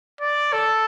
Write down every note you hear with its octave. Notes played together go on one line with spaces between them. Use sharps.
D5
A4